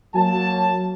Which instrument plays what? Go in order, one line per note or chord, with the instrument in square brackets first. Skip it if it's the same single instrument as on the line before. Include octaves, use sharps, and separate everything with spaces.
[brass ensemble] F#3 A#3 A5